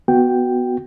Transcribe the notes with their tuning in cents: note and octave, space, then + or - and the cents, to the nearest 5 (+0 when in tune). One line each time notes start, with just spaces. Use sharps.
B3 +0 F#4 +0 G5 +0